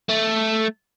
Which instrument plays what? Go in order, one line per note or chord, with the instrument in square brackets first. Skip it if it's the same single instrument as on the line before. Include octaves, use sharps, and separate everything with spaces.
[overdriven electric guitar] A3